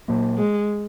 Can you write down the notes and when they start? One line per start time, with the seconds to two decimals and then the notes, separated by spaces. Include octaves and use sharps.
0.08 A#2 F#3 A#3
0.38 G#3